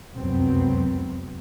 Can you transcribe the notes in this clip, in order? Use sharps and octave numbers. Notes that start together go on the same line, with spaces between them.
F1 C#2 F#2 F#3 B3 C4